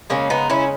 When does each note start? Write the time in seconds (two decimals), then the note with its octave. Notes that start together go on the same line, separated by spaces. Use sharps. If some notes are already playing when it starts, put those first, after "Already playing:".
0.10 C#3 G#3 A#3 C#4
0.30 B3 D#4
0.50 C#4 E4